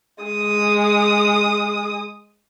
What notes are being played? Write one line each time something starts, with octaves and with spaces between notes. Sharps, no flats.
G#3 D#6